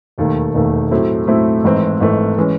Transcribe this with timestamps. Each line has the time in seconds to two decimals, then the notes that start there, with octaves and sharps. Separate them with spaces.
0.18 E1 D#2 D#3 A3
0.54 E1 D#2 D#3 A3
0.91 A2 F#3 A3 C4 E4
1.27 A2 F#3 A3 C4 E4
1.64 G#1 G#2 E3 A3 C4
2.00 G#1 G#2 E3 A3 C4
2.38 E3 G#3 C#4